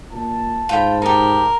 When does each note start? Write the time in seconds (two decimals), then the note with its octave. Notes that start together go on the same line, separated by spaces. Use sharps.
0.12 A#2 A5
0.69 G#2 F4 G5 B5
1.02 D#4 G4 A#4